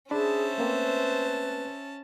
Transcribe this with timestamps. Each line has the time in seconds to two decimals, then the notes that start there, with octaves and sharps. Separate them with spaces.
0.11 C#4 D4 G#4 C5 E5 A5 B5
0.58 A3 A#3 C4 B4